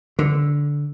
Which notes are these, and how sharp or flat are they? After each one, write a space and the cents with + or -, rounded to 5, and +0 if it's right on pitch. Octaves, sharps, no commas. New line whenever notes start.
D3 -10